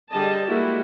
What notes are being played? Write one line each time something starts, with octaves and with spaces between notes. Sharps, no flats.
D3 G3 G#4 D#5 A5
G3 G#3 A#3 E4 F#4 G4